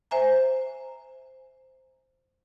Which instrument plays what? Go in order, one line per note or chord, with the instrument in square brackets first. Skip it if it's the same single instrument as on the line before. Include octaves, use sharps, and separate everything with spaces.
[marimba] C5 E5 G#5 A#5